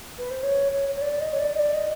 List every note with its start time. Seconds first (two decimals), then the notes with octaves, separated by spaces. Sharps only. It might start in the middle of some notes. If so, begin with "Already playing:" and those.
0.18 B4
0.31 C5
0.43 C#5
0.73 C#5
0.95 C#5
1.01 D5
1.21 D#5
1.33 C#5
1.40 D5
1.55 D#5
1.59 D5
1.74 D#5